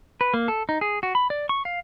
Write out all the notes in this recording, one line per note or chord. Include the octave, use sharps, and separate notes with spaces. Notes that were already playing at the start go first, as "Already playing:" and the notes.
B4
A#3
A4
D#4
G#4
F#4
B5
D5
C#6
F5